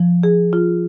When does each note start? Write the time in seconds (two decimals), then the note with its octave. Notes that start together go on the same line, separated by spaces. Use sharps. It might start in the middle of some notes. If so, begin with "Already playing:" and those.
Already playing: F3
0.23 G#4
0.53 F4